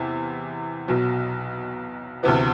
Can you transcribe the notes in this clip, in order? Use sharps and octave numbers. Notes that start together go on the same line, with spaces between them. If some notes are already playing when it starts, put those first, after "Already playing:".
Already playing: E2 C3
B1 B2 F#3
D2 C3 E3 B3